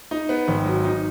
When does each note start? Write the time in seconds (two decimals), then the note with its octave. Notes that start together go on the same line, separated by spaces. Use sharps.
0.11 D#4
0.29 B3
0.48 G#1
0.66 F#3
0.84 D#4